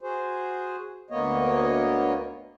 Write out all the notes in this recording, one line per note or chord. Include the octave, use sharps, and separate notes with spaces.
F#4 G#4 C5
D2 A#3 B3 C#5 D#5